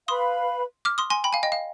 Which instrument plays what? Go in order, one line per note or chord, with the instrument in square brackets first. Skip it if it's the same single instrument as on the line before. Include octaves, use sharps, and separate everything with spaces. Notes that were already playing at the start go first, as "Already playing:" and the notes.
[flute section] B4 F5 B5 [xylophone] C6 D#6
[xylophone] D6 F6
C6 D#6
G#5 C6
G5 B5
F5 G#5
D#5 G5
F5